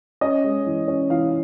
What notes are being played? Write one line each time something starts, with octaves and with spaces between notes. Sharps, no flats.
C#4 D#5
G#3
E3
C#4
E3 F5